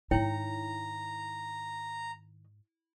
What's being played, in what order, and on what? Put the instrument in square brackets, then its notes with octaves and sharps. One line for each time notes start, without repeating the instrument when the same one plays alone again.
[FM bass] G#2 [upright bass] D#3 D#4 [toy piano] E4 C#5 G5 [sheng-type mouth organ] A#5